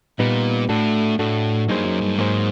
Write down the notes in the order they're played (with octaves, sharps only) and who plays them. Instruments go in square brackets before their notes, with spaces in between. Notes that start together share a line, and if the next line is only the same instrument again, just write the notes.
[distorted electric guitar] A#2 [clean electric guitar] G3 B3 D#4
[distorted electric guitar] A2 [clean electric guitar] A3 D4 F#4 A4
[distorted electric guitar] A2 [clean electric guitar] A3 D4 F#4 A4
[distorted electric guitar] G2 [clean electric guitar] F#3 A#3 D#4 G#4 C5
[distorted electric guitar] F#2
G2
[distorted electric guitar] G#2 [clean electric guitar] F#3 A#3 D#4 G#4 C5